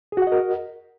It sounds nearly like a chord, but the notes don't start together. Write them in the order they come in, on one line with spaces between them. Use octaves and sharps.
G#4 F#4 F#5 D#5 A#4